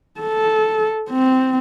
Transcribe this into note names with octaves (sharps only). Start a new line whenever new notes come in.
A4
C4